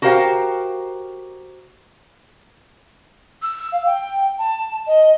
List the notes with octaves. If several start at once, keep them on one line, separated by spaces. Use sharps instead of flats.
F#4 G4 A#4 C5 F5 G5
E6
F5
G5
A5
D#5